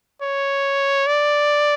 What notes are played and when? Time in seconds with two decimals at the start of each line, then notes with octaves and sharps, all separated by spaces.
0.22 C#5
1.07 D5